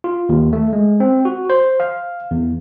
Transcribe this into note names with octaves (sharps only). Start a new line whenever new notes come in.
F4
D#2
A3
G#3
C4
F#4
C5
F5
E2